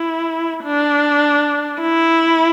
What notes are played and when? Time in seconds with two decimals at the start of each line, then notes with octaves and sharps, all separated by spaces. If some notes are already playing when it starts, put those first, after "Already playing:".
Already playing: E4
0.64 D4
1.81 E4